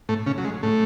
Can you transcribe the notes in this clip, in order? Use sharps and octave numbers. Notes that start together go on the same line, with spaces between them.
A2 A3
C#3 C#4
F#3
G#3
A2 A3